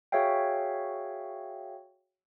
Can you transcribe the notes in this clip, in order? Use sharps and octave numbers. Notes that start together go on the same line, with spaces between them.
F#4 G#4 C#5 E5 F5 G5